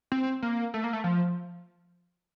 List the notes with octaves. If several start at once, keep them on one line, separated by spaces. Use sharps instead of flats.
C4
A#3
A3
A#3
A3
F3